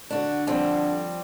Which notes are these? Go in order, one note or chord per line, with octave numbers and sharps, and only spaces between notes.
D3 D4 F#4
F3 G3 C4